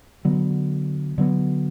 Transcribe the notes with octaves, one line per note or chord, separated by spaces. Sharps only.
D3 F#3 B3
D3 F#3 B3